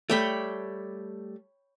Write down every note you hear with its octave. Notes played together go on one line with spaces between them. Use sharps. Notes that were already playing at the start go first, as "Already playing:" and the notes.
G3 A3 C#5 G5 B5